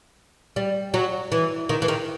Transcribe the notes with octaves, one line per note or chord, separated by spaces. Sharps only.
G3
F#3
E3
D#3
E3
D#3